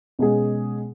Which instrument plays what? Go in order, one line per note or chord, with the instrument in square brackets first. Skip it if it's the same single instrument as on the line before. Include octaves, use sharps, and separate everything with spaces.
[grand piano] B2 G#3 C#4 G#4